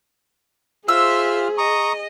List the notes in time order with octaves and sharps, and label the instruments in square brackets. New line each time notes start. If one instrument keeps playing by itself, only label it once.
[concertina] F4 F6 [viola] G#4 [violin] C5 E5 [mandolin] E6
[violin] D#5 [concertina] A#5 C#6 D#6